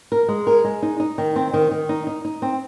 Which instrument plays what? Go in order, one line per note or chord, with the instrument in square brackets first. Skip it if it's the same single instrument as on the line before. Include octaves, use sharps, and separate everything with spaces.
[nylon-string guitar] A#4
G#3
A#4
G#3
D#4
D#4
D#3
C4
D#3
D#3
D#4
D#4
D#4
C4